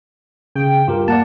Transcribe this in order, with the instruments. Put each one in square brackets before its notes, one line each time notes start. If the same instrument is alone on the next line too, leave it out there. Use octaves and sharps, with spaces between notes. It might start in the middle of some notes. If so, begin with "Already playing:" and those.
[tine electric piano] C#3 [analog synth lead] G5
[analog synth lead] G2 [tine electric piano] F4 G4 A#4
[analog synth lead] A#3 [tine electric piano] D5 F#5 A5